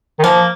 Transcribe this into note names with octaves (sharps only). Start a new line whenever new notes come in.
D#3
F3 A#3